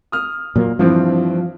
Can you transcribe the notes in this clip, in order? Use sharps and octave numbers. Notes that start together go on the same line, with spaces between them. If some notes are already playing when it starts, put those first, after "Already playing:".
D#6 F6
A#2 F#3 A#3
G2 E3 F3 C4